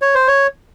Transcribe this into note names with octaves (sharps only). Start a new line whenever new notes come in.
C#5
C5
C#5